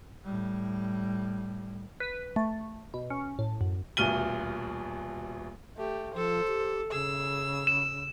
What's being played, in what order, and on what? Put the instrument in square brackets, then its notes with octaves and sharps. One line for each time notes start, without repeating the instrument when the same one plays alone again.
[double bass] A2 G3
[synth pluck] B4
A3
B2
C#4
A2
F#2
[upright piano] D#1 D2 B2 F6 D#7 G7
[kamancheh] A3 [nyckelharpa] G4
[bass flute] F3 [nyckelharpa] A4 [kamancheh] C5
[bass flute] G4
[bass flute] C#3 [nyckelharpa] G#4 [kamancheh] E6
[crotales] E7